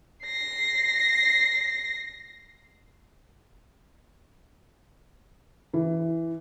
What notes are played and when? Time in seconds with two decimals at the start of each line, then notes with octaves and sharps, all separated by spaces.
0.24 A#6 C7
5.73 E3